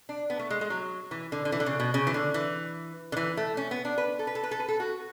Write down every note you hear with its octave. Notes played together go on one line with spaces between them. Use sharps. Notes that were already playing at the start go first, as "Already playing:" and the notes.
D4
B3
A3
G#3
G#3
F#3
E3
D3
D3
E3
D3
C#3
B2
C#3
E3
D3
E3
D3
E3
A3
C#4
B3
D4
B4
A4
B4
A4
B4
A4
B4
A4
F#4